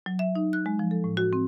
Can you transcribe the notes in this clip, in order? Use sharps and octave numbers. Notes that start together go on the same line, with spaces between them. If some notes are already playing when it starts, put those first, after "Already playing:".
F#3
E5
D#4
F#6
G#3
F3
A4
A2
F#4
C4